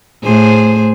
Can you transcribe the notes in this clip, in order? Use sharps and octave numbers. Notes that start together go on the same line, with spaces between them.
A2 G#4 C5